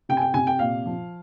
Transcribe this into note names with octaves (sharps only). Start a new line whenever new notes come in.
C3 G5
G#5
G5
C3 G#5
G5
A#2 F5
F3